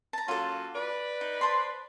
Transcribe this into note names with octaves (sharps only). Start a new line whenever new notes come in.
A5 A#5
F#3 A#3 C#4 F4 A4
B4 D5
D#4
C5 A5 C6